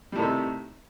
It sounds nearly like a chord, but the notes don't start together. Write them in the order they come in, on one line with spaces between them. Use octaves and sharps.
G3 A2 D#3 C3